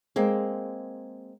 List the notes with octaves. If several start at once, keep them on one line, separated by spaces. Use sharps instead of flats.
G#3 A#3 C4